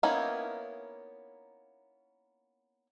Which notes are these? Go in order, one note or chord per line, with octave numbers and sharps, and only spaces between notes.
A#3 B3 C#4 D#4 E4